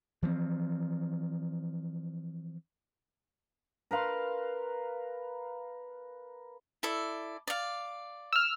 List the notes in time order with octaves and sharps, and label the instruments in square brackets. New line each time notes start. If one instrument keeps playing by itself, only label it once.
[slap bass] E3 F3 A#3 C4
[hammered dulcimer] A#4 B4 F5 C6
[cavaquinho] E4 A4 D5
D5 F5
[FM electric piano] E6 F6